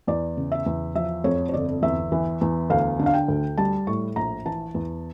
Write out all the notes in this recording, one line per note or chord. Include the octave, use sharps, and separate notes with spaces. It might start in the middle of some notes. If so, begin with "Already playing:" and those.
E2 D5
C#3
E5
E2
F3 E5
F2 C#5
C#5
G1 D5
E2 E5
E3
E2
D2 F5
D3
F5
G5
D2
G3 A5
A2 C#6
A#1 A#5
E3 A5
E2